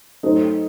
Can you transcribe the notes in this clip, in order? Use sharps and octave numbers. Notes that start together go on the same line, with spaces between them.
F#3 A3 D#4 A4 C5